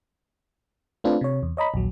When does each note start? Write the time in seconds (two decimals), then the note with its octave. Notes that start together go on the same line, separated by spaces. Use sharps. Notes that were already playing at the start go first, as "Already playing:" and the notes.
1.04 A3 C4 D4 F4 B4
1.21 C3 C#5
1.43 E2
1.57 C#5 D#5 A#5 B5
1.74 A#1 D#2 F#3